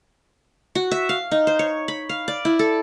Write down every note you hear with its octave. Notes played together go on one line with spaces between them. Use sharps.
F#4
E5
F5
D#4
C5
C#5
B5
F5
D5
E4
A4